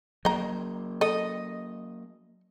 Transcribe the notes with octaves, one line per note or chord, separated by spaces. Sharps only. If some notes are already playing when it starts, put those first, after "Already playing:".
F#3 A#3 D#5 A#5
A4 D#5